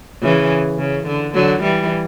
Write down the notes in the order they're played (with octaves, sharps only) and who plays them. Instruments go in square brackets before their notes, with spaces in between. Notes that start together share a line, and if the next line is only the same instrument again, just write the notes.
[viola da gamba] C#3 E3
C#3
D3
D3 F#3
E3 G3